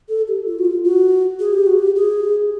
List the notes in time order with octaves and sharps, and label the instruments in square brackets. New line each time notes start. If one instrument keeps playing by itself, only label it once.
[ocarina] A4
G4
F4
F#4
F4
F#4
G#4
G4
F#4
G4
G#4